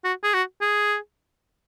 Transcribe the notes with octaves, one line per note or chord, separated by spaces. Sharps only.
F#4
G#4
F#4
G#4